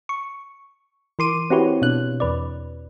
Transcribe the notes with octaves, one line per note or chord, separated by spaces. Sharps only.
C#6
E3 A#4 C6 D6 D#7
C4 E4 F#4 G4 B4 C#5
B2 D4 F#6
E2 B4 D5